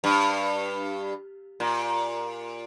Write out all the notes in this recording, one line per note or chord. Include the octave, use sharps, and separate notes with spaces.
G2
A#2